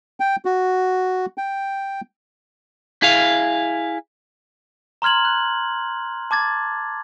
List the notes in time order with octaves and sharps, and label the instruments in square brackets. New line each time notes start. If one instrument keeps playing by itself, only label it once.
[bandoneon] G5
F#4
G5
[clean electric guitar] E4 G#4 F5
[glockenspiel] A#5 C6 F6 G#6 F#7
F#6
A5 D6 G#6 A6